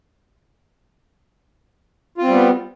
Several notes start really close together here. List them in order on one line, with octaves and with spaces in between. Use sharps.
F4 C4 G3 B3